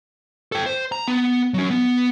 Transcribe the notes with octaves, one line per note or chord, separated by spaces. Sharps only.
A4 G5
C5
A#5
B3
F#3 C#4
B3